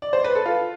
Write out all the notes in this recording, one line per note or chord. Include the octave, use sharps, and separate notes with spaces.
D5
C5
B4
A4
F4